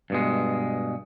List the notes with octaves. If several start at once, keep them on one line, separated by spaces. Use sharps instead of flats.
G2 B2 G#3